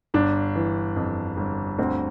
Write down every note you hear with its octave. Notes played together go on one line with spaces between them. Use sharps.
G1 D4
E3
F2
G1
D2 C4